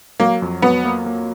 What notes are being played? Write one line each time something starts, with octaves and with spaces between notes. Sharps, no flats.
F#3 A#3
F2
F#3 B3
A#3
A#3